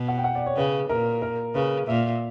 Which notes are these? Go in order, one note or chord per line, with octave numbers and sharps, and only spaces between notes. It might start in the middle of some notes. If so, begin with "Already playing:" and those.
Already playing: B2
F#5
G5
F#5
D5
C#5
C#3 B4
A#2 A#4
A#4
C#3 B4
A#2 E5